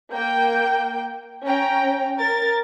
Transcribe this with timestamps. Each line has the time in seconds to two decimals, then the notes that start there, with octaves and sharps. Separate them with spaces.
0.13 A#3 G5 G6
1.46 C#4 G5 A#5
2.20 A#4 A6